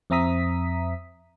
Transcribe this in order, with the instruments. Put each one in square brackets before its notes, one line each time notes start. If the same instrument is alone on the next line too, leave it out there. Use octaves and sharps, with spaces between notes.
[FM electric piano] F2 C4 E5 A#5 D#6 B6